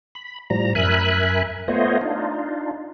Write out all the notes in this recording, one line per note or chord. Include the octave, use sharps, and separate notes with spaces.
B5
A2 F3 G3 A#5
F#2 A#4 E5 G#5 B5 F#6
A3 B3 F4 C5 C#5 D#5
D4 D#4 F4